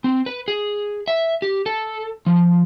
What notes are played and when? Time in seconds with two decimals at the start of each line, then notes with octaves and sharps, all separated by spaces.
0.04 C4
0.26 B4
0.48 G#4
1.08 E5
1.42 G4
1.66 A4
2.26 F3